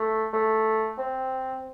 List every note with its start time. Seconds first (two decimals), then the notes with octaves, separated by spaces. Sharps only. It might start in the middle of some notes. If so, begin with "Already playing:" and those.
Already playing: A3
0.33 A3
0.98 C4